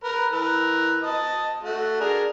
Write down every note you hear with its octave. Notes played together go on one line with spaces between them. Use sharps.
A#4 B4
E3 A#4 B4
D#5 A5 D#6
A3 F#4
D4 G#4 A#4